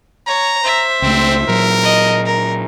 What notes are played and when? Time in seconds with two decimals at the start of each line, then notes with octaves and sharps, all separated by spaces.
0.27 C#5 A#5
0.63 C5 E5
1.02 C#2 A3 C4
1.48 A#2 F#3 A#4
1.83 D#5
2.26 A#4